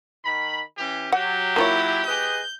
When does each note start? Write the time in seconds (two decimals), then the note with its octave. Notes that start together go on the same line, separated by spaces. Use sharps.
0.24 D#3 B5
0.78 E3 C#4 G4
1.12 F#3 G4 F#5
1.56 A#3 E4 F4 C#5
2.06 G#4 B4 D#5 G6